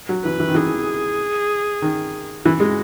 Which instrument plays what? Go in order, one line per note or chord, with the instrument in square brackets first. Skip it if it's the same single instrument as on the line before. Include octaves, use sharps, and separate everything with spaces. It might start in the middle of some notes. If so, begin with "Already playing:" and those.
[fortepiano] F#3
[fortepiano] E3 [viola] B4
[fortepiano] E3
D#3
[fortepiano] E3 [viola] G#4
[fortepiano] D#3
[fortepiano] E3 [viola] F#4
[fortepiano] G#3